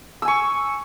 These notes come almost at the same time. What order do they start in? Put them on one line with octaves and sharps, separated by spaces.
E6 G#5 C#6